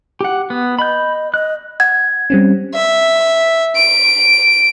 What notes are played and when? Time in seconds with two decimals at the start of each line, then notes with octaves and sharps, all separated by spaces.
0.21 G4 F#5
0.50 B3
0.79 D#5 B5 G6
1.34 D#5 F#6
1.80 F#5 G#6
2.30 G3 C4 C#4
2.75 E5
3.76 D7